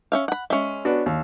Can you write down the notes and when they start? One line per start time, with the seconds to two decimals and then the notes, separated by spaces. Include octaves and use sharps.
0.12 C#4 E5 F5
0.28 F#5 B5
0.50 G#3 C#4 E5
0.85 B3 D4 F#4
1.06 D#2